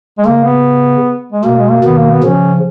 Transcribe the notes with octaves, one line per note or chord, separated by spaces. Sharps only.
G#3
C#3 A#3
B3
G#3
B2 A#3
G#3
A#3
B2 D#3 B3
A#3
B3
C#3 F3 C#4